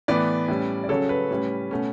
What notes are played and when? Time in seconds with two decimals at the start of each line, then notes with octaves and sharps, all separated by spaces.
0.08 A2 E3 B3 B4 D5
0.48 A2 G3 C#4
0.84 D5
0.89 C#3 F#3 C#4 A4 C#5
1.09 B4
1.31 A2 G3 C#4
1.71 B2 A3 C#4